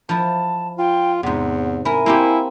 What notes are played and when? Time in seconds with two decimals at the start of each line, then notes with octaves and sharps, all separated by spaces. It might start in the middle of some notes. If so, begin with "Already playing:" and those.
0.09 F3 E4 A5
0.79 F4 G5
1.23 E2 G#2 C3 F#5
1.85 E4 A#4 G#5
2.06 A#3 C4 E4 G4